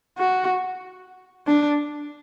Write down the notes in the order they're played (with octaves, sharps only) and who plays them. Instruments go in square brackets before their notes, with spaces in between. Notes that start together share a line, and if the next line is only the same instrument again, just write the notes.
[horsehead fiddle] F#4
D4